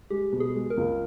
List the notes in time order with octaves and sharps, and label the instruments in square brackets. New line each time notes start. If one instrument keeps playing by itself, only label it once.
[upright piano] G#3 [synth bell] G4
[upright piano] B2
[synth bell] G#4
[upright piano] G#3
[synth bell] A#4
[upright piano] C#2